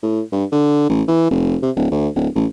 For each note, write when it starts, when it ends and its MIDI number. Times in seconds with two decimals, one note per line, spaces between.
0.03 0.21 45
0.32 0.45 43
0.52 0.88 50
0.89 1.02 33
1.08 1.29 52
1.31 1.57 29
1.62 1.71 48
1.76 1.87 26
1.91 2.08 38
2.16 2.28 26
2.35 2.46 33